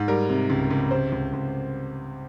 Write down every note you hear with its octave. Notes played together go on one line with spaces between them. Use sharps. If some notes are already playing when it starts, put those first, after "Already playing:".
Already playing: G#2
G3 A#4
C3
C#2
C#2
C3 C5
C#2
C#2